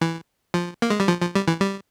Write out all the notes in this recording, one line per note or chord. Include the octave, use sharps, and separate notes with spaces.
E3
F3
A#3
G#3
G3
F3
F3
G3
E3
G3